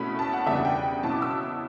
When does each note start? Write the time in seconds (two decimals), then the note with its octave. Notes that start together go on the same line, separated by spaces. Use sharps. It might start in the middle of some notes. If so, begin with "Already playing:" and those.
Already playing: B2 A3 C#4 E4 B5
0.19 A5
0.33 F#5
0.46 E2 C#3 G3 D4 E5
0.56 F#5
0.65 G5
1.03 B2 F#3 C#4 E4 A5
1.13 D6
1.22 E6